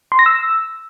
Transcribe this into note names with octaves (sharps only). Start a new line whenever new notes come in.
C6
A#6
E6